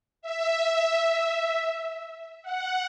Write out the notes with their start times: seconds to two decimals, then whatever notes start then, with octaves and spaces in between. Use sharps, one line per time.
0.22 E5
2.43 F#5